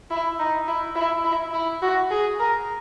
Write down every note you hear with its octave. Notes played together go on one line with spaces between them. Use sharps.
E4
D#4
E4
E4
E4
E4
F#4
G#4
A#4